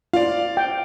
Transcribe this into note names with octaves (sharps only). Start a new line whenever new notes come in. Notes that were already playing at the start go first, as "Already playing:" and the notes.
F4 D5 F5
G5